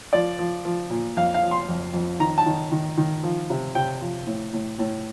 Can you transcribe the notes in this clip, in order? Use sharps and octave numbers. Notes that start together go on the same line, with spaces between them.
F3 D5
F3
F3
A#2
F2 F5
F5
F3
C6
F2
F2
D#3 A#5
A5
D#3
D#3
D#3
F3
C3
C3 G5
F3
A2
A2
A2